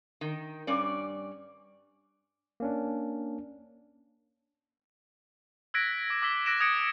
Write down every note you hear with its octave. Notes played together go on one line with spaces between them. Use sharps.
D#3
G2 C#4 D5
A#3 C#4 D4
E6 F#6 G#6 A#6 B6 D7
D6
D6 E6 B6 G7
D6 E6 F#6 A#6 D7 E7
D#6 G#6 A#6 C#7 D7 E7